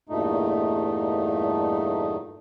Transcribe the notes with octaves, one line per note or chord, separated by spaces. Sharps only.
E2 G2 A#2 A3 D#4